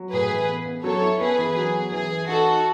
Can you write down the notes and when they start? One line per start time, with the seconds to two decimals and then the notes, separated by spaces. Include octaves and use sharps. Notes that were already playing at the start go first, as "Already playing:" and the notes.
Already playing: F#3
0.12 A2 G#4 B4
0.30 E3
0.48 B3
0.66 B3
0.84 F#3 A4 C#5
1.02 E4
1.21 B3 G#4 B4
1.39 E3
1.56 F#3 G#4
1.75 B3
1.92 E3 G#4
2.10 E3
2.28 D#4 F#4 A4
2.46 D#4